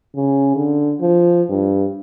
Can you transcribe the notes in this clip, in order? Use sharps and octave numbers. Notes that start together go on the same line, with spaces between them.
C#3
D3
F3
G2